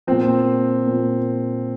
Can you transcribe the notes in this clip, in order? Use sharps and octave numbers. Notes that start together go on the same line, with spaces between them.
A#2 F3 C4
A#2 F3